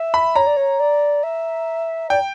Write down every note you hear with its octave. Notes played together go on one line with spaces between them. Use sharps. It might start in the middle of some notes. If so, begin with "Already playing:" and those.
Already playing: E5
B5
C#5 A#5
D5
C#5
D5
E5
D5 G5